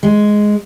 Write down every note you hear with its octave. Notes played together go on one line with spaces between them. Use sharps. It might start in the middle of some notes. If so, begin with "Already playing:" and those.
G#3